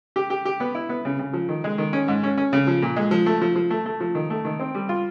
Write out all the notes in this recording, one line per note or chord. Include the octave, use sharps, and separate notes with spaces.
G4
G4
G4
B3
E4
B3
C#3
C#3
F3
D#3
G#3
D#3
C#4
G#2
C#4
C#4
C#3
F3
A#2
G#3
F3
A3
F3
F3
A3
A3
F3
D#3
A3
D#3
C4
G3
F4